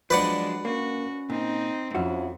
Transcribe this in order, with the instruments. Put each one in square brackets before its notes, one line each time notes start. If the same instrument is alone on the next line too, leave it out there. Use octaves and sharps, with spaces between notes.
[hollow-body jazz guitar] F3 [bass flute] F#3 [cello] G#3 D4 [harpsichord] B4 D5 F#5
[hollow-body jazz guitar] A#3 [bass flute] C#4 [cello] F#4
[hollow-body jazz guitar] A#2 [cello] C4 D#4
[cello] F2 [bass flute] F3 [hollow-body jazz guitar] C#4 E4 F#4